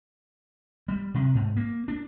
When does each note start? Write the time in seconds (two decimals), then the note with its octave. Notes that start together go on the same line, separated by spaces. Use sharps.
0.88 G3
1.14 C3
1.35 G#2
1.57 A#3
1.88 D4